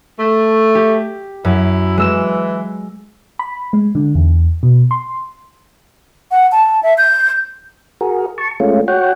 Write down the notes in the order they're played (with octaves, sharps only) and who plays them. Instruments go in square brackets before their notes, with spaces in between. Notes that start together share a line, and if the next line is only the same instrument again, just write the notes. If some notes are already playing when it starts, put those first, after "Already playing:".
[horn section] A3
[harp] G4
[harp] F#2 [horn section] E4
[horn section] E3 [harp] G#3 E6 E7
[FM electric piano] B5
G#3
D3
E2
B2
C6
[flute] F#5
A5
E5
G6
[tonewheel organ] F#4 G#4 A#4
A5 C#6
G#3 A3 C#4 F4
F#4 C#5 F#5 G5